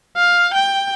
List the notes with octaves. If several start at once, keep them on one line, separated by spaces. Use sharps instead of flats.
F5
G5